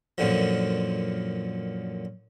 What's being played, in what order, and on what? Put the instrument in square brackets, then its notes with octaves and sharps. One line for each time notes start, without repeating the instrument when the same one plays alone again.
[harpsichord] F#2 A#2 D3 F3